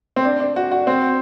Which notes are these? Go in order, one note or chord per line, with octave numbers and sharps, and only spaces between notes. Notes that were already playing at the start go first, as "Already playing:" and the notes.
C4
D4
D4
F#4
F#4
C4